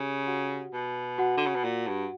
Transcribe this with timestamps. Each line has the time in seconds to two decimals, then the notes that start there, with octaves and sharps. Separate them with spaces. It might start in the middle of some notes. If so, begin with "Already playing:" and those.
Already playing: C#3 G4
0.27 F#4 F#5
0.73 B2
1.18 F#4 F#5
1.37 D3
1.46 C#3
1.55 B2
1.64 A#2
1.88 G2